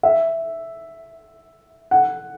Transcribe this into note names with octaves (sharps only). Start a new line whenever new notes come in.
E5
F#5